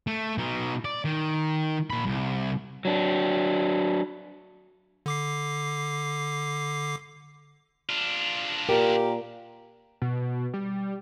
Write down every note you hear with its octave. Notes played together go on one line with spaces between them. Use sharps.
A3
B2 D#4
D5
D#3
A#2 B5
C2
F#3 D4
D3 D6 C7
D4 F4
A#2 G4 A#4
B2
G3